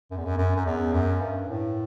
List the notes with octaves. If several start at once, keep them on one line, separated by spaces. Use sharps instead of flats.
F#2
E2
F#2
F#2
F#2
E2
F#2
G2
A2